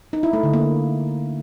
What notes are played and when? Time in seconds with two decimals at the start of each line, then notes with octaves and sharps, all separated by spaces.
0.13 D#4
0.23 E4
0.33 A3
0.43 D3
0.53 A#3